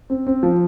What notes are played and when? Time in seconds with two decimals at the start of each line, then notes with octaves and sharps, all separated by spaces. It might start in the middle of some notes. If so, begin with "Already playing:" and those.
0.10 C4
0.27 C4
0.43 F3